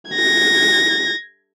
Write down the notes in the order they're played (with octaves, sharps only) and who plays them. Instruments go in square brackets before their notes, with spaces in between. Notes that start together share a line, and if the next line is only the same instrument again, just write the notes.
[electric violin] G#6 A#6